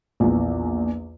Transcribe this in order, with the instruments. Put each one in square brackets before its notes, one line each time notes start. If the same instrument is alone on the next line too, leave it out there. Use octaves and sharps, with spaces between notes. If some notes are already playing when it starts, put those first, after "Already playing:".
[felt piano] A#1 E2